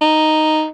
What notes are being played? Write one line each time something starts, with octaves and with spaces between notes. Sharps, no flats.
D#4